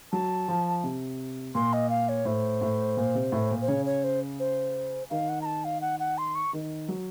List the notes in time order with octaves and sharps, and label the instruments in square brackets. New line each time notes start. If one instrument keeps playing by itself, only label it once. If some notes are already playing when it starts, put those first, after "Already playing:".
[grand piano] F#3 [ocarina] A5
[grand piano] F3
C3
[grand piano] A#2 [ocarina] C6
[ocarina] D#5
F5
C#5
[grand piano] A2 [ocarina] C5
[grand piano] A2
A#2
C3
A2
A#2
[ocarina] C5
[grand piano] C#3 [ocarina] C#5
[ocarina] C#5
C5
C5
[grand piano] D#3 [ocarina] F5
[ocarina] F#5
A#5
A5
F5
F#5
F#5
C6
C#6
[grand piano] D#3
F#3